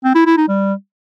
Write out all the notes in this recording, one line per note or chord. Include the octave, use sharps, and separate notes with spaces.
C4
E4
E4
D#4
G3